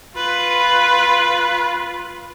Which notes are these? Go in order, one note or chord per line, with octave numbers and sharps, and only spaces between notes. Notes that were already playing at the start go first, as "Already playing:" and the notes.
F4 B4